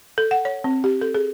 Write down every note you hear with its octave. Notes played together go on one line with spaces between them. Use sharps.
A4
F#5
C#5
C4
G4
A4
G#4